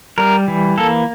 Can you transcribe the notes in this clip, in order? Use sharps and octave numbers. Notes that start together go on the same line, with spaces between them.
G3 A#4
E3
A#3 A4